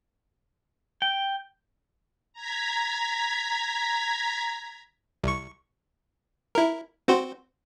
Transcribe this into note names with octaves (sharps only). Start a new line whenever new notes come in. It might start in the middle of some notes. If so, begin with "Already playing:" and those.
G5
A#5 G#6 B6
C2 C#6
E4 A#4
C4 F#4 C5